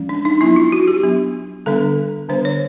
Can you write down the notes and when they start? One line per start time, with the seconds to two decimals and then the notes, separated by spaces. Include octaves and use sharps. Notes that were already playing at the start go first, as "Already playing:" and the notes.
Already playing: F3 G#3 C#4
0.09 D4
0.25 D#4
0.41 F#3 B3 D4 E4
0.56 F4
0.72 F#4
0.88 G4
1.03 F#3 B3 D4
1.66 D3 G3 B3 D4 A4
2.29 D3 G3 B3 D4 C5
2.45 C#5